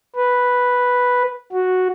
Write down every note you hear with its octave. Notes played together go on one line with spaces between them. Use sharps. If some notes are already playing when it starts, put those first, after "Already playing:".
B4
F#4